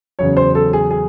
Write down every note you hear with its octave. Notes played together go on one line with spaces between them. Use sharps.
E2 C#3 F#3 C#5
C5
A4
G#4
G#4